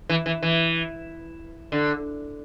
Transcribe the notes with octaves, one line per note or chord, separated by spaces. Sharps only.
E3
E3
E3
D3